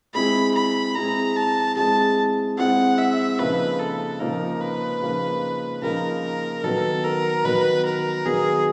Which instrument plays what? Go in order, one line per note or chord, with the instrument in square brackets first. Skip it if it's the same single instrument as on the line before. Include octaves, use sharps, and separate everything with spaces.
[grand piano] G#3 C4 E4 G#4 [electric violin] B5
[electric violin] B5
[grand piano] G#3 C4 E4 G#4 [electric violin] A#5
[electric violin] A5
[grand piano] G#3 C4 E4 G#4 [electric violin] A5
[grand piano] G#3 C4 E4 G#4 [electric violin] F#5
[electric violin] E5
[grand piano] C#3 F3 A#3 D#4 [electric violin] B4
[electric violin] A4
[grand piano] C#3 F3 A#3 D#4 [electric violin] A#4
[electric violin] B4
[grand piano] C#3 F3 A#3 D#4
[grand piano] C#3 F3 A#3 D#4 [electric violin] A#4
[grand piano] D#3 F#3 B3 [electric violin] A4
[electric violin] A#4
[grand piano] D#3 F#3 B3 [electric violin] B4
[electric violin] A#4
[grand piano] D#3 F#3 B3 [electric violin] G#4